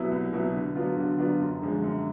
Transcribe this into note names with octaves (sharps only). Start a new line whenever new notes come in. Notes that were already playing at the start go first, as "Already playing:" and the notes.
Already playing: C2 B2 F#3 B3 E4
C2
B2 F#3 B3 E4
D3
F#3 B3 D4 F4
D3
F#3 B3 D4 F4
F#2
D3 F3 G#3
F#2